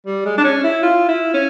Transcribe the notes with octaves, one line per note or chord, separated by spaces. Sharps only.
G3
G#3
D4
C#4
E4
F4
E4
C#4